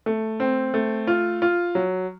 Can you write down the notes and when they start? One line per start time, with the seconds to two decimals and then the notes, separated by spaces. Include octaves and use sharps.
0.06 A3
0.40 C4
0.74 A3
1.07 F4
1.42 F4
1.75 F#3